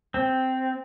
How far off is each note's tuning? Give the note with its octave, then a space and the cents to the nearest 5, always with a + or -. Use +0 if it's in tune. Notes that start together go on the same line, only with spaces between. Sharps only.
C4 -5